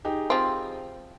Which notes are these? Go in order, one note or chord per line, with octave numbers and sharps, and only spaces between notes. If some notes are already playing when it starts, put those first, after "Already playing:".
D#4 G4 G#4
F3 C4